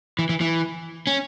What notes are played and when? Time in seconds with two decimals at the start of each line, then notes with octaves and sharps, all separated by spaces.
0.19 E3
0.29 E3
0.41 E3
1.07 C#4